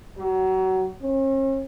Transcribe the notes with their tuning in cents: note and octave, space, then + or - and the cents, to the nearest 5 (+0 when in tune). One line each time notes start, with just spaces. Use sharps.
F#3 +25
C#4 -45